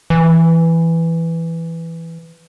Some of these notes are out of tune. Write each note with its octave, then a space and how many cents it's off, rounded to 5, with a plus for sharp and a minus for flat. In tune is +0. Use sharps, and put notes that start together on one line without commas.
E3 +5